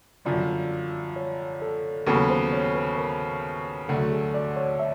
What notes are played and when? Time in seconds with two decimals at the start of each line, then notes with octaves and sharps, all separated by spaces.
0.25 G1 F#2 D3 F3 D5
1.16 C#5
1.62 A4
2.07 D#2 C#3 F#3 B3 A4
2.30 C5
2.53 C#5
2.75 B4
2.98 A#4
3.89 D2 D3 F#3 A3 A4
4.11 G#4
4.34 D5
4.56 C#5
4.79 E5